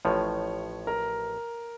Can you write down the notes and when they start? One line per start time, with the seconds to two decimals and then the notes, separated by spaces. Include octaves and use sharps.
0.05 A1 A2 F3 C#5
0.87 A#4